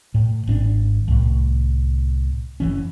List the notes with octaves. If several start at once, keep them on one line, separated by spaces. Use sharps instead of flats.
A2
G#1 C4 D4
C2 A2
F#1 E3 C#4